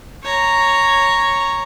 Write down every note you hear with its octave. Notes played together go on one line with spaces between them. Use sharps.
C#5 A#5